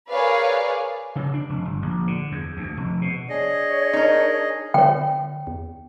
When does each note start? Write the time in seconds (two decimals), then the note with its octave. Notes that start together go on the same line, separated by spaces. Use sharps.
0.11 G#4 A#4 B4 C#5 D5 F5
1.16 C#3
1.34 D4
1.49 F1
1.65 G1
1.82 A#1
2.07 D3
2.32 E2
2.57 D2
2.77 F1
3.02 B2
3.29 D4 G#4 C#5 D#5
3.93 D#4 A#4
4.74 D3 C#5 G5
5.47 E2